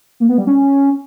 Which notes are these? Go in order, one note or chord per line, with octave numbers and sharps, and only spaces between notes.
A#3
B3
G3
C#4